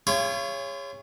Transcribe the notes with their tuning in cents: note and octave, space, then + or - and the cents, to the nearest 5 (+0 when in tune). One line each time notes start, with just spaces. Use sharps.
F4 -40 G#4 -35 C#5 +0